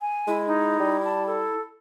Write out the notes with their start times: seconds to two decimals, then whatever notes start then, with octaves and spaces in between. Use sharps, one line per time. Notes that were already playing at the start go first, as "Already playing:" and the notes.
0.01 G#5
0.28 G#3 E4
0.47 D#4
0.80 G3
1.04 A5
1.26 A4